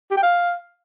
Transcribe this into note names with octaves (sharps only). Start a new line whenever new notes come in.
G4
G5
F5